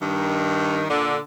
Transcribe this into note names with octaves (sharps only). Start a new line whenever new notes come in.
G2 D#3
A#2 D3